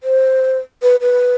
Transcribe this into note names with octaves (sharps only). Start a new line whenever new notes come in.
C5
B4
B4